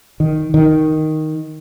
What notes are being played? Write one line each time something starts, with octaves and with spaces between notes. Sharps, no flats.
D#3
D#3